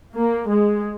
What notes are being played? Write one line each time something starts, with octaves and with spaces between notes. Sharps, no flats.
A#3
G#3